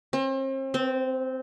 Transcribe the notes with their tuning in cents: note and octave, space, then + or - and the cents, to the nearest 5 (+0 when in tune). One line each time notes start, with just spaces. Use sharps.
C4 +40
C4 -10